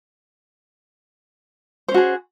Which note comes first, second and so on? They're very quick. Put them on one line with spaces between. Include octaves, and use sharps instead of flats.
C5 C#4 F#4 G#4